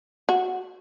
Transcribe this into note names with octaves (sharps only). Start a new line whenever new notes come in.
F#4